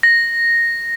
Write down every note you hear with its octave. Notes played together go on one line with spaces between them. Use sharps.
A#6